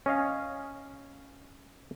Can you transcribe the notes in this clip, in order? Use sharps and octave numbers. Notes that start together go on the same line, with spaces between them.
C#4 D#5 F5